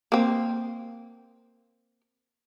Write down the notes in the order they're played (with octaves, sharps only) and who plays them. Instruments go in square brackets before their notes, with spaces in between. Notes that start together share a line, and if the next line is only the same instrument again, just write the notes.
[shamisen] A#3 C4